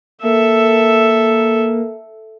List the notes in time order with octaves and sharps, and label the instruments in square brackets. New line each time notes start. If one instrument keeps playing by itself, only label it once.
[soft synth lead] A#3 [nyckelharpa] A4 E5